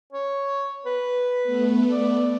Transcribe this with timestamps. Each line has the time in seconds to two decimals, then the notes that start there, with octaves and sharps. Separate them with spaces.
0.13 C#5
0.86 B4
1.44 A3 B3
1.90 D5